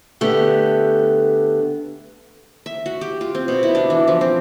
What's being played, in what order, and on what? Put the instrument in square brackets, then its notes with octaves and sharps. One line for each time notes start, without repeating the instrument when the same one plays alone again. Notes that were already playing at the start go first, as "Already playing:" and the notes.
[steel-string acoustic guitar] D3 A3 B3 G4
[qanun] E5
F#4
G4
F4
C4
B2
E4
D4
E3
F3
C4